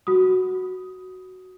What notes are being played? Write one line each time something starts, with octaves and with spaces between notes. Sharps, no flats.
F#4 D#6